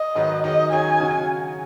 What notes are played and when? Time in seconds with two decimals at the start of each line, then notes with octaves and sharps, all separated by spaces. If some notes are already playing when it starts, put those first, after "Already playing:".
Already playing: D#5
0.15 G#2 D#3 F#3 D#4 B4
0.44 D#3 F#3 D#4 G#4 D#5
0.72 D#3 F#3 C#4 G#4 C#5 G#5
1.00 C#3 F#3 C#4 F#4